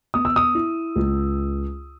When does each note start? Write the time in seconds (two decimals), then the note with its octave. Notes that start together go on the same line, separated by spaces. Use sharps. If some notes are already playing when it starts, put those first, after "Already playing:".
0.14 B3 D#6
0.25 E6
0.36 D#6
0.55 E4
0.96 C#2